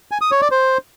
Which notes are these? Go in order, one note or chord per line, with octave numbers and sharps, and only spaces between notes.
G#5
D#6
C#5
D5
C5